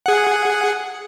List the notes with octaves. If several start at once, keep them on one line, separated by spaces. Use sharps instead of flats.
G#4 F#5